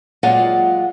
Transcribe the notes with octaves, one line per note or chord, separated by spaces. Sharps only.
A#2 F#3 G#3 F4 F#5